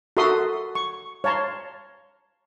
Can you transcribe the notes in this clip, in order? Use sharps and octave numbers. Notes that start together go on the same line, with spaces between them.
F#4 A4 A#4 E5 C6 D#6
C#6
C#5 F5 A5 A#5 C6